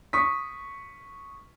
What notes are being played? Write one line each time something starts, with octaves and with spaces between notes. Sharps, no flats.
C#6 D#6 B6